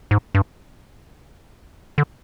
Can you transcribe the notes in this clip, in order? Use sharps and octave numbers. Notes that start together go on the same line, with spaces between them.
G#2
G2
D3